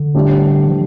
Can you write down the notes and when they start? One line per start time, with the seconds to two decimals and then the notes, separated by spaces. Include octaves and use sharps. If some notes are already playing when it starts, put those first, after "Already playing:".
Already playing: D3
0.14 A2 G3 D4
0.68 F3